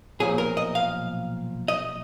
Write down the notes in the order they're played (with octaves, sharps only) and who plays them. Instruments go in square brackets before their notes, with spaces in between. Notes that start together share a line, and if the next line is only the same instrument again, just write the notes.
[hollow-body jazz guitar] B1 A#2 F3 G#4
A#4
D#5
F5
D#5